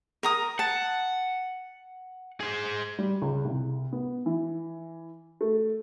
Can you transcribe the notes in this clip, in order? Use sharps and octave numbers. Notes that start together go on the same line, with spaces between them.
A#4 A#5 D#6
F#5 A5
G#4 C5
G3
C#2
C2
B3
E3
A3